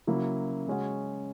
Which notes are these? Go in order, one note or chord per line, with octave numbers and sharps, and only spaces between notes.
C#3 F#3 A#3 E4
C#3 G#3 C#4 F#4